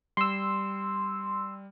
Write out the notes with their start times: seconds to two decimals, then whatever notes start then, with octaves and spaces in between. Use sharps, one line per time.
0.17 G3 C6 E6